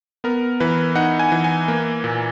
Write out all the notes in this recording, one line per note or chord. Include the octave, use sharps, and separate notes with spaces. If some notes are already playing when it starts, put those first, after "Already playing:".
B3 A#4
E3 B4
D#4 F#5
G#5
E3
G#5
A#3
A#2